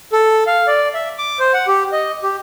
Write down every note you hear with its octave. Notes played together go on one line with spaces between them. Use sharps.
A4
F5
D5
E5
D6
C5
F#5
G4
D#5
G4